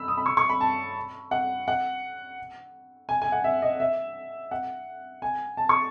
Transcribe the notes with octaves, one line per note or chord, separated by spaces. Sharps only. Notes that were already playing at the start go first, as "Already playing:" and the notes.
Already playing: B5 E6
D#6
B5
C#6
C#6
B5
A5
F#5
F#5
G#5
G#5
F#5
E5
D#5
E5
F#5
G#5
A5
C#6